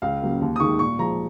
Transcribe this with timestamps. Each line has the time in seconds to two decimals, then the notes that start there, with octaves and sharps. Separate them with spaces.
0.02 C#2 F5
0.22 C#3 F#3 A#3
0.41 D#2
0.56 D#6
0.60 D#3 G#3 C#6
0.79 A#2 C#6
0.99 F3 G#3 A#5